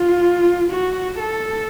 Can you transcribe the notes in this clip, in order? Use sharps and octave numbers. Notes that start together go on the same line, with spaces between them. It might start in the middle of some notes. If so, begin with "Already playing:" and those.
Already playing: F4
F#4
A4